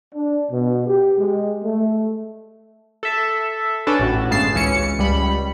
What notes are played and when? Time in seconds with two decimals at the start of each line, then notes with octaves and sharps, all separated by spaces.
0.14 D4
0.51 B2
0.87 G4
1.18 G#3
1.64 A3
3.03 A4 E5
3.87 C#4 D4 A4 B4
3.99 A1 A2 F#4
4.30 G1 C#3 G#3 A5 C7
4.53 G#1 C#2 E3 C#4 C#7
4.99 C#2 G3 B5